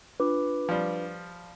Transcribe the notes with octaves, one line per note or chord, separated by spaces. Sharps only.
D4 F4 B4 D6
F3 G3